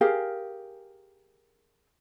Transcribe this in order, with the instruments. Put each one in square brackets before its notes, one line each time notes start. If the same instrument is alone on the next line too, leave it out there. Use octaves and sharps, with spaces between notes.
[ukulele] G4 G#4 A#4 F5